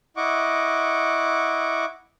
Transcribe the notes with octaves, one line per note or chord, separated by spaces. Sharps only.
E4 D#5 F#5 C#6 D6